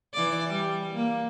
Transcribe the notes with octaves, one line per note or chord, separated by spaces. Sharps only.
E3 D5
G3
A#3